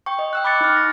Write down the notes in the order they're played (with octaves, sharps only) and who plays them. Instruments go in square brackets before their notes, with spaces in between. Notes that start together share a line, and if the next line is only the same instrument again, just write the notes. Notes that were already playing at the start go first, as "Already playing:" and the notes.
[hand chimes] G5 C#6
D#5
G5 E6 F#6
B5 D6 F#6 A6 C#7
D#4 F6
A#6